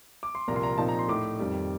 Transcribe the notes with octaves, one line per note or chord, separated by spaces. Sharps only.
D6
C6
C2 A#2 F3 A#3 A#5
C6
A#5
A#2 F3 C4 D#4 A5
A#5
C6
A2 A3 D#4 D6
F2 D#3 G3